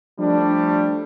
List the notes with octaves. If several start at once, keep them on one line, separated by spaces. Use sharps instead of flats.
F3 G3 A3 D4